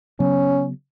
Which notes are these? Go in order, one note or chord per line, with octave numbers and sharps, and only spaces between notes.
C#3 F#3 B3 C#4